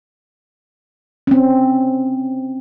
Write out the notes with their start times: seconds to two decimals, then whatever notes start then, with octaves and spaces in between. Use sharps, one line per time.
1.27 C4 C#4